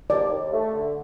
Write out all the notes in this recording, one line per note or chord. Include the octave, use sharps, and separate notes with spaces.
D#2 D5
D#2
A3
D3